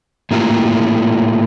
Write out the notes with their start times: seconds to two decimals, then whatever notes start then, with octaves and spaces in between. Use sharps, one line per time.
0.31 A2 A#3 E4 F4 G4